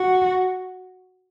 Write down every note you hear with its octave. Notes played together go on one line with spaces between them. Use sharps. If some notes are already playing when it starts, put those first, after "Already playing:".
Already playing: F#4